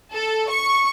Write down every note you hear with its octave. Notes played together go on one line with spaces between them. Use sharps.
A4
C#6